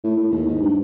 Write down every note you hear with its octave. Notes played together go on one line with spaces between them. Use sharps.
A2
A2
D#2
G#2
G2